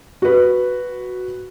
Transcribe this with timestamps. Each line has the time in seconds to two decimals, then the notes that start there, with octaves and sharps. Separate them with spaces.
0.22 F#4 B4